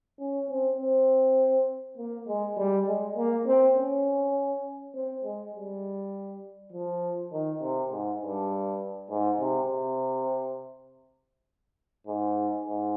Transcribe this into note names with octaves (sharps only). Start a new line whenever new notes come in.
C#4
C4
C4
A#3
G#3
G3
G#3
A#3
C4
C#4
C4
G#3
G3
F3
D#3
C3
G#2
G2
G#2
C3
C3
G#2
G#2